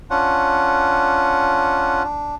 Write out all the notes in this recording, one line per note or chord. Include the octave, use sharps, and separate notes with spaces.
C#4 D4 F4 F#5
D4